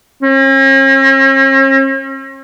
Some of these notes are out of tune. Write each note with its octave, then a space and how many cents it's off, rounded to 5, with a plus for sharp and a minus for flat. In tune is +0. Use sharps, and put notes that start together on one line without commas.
C#4 -45